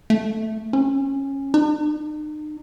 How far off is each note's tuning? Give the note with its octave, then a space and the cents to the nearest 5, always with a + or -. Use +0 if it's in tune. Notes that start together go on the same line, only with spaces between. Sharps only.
A3 +0
C#4 -15
D#4 -40